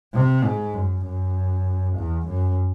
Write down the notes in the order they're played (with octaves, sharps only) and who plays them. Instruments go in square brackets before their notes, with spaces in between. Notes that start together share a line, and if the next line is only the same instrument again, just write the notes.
[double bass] C3
G#2
F#2
F#2
E2
F#2